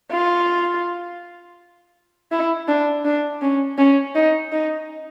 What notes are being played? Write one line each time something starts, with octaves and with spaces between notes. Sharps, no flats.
F4
E4
D4
D4
C#4
C#4
D#4
D#4